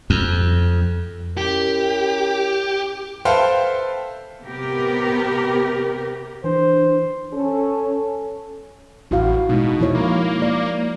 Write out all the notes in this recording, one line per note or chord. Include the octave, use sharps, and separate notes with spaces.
F2
C#4 E4 G4 A#4
A4 B4 C5 E5 F5 G5
C3 B3 G4 A#4
E3 D4 C5
C#4 A4
A1 E4 F#4 F5
B2 G#3 D#4
F3 E4 C#5
A#3
D5